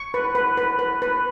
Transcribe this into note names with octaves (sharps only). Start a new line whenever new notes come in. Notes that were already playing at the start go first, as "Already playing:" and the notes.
Already playing: C#6
B4
B4
B4
B4
B4